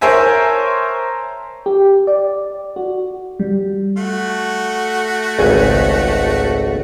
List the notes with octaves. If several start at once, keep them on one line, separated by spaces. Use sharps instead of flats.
A#4 C5 C#5 E5 G#5 A5
G4
D5
F#4
G3
A3 F#4
G#1 C#2 G#5